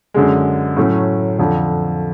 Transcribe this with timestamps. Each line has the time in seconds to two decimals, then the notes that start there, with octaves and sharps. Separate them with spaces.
0.14 F#2 D3 G#3
0.77 A2 F#3 A3 C#4
1.39 F2 D3 F3